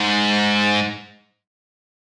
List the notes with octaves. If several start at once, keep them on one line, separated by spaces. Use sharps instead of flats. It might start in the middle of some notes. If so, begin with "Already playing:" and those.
Already playing: G#2